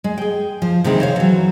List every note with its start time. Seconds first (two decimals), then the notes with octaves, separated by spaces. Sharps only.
0.04 G#3
0.18 G#4 G5
0.62 F3
0.84 C3 D#3 E3 G#3 C4
1.00 C5 C#5 F5
1.16 E3 F#3